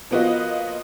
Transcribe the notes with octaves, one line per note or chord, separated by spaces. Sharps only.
F3 A#3 B3 F4 F#4 D#5